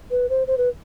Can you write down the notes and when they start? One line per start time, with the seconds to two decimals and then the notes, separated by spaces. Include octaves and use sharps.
0.11 B4
0.29 C5
0.47 C5
0.58 B4